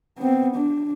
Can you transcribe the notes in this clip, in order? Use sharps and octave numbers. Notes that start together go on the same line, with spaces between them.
B3 C4
D4